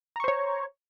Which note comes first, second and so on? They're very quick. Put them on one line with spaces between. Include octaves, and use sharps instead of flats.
A#5 C#6 C5 C#5